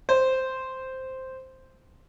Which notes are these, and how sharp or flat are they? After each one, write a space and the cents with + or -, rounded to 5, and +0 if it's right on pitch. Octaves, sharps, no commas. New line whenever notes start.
C5 +0